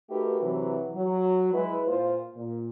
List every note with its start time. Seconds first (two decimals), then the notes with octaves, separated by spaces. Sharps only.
0.10 A3 D#4 F#4 G4 A#4 B4
0.41 C3 E3 F#3
0.95 F#3
1.54 G#3 E4 B4
1.88 A#2 F4 C5
2.35 A#2